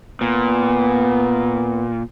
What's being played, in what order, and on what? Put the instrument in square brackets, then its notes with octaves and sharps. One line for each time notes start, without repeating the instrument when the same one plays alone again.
[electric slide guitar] A#2 [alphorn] B3